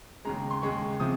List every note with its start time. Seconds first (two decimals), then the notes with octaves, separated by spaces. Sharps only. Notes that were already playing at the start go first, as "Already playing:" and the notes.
0.25 D#2 C#3 G#3 A#5
0.51 C6
0.62 D#2 C#3 G#3 C#6
1.00 C3 F3 D#6